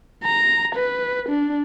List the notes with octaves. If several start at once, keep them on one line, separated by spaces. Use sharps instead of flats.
A#5
B4
D4